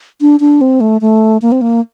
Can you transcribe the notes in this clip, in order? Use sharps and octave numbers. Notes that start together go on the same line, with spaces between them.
D4
D4
C4
A3
A3
A#3
C4
A#3